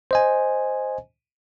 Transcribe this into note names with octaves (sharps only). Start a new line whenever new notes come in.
C5 D#5 G#5